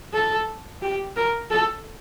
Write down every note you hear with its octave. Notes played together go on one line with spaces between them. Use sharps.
A4
G4
A#4
A4